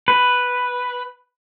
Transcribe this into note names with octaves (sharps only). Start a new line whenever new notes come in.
B4